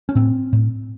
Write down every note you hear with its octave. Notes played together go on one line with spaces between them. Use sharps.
C#4
A2 C4
A2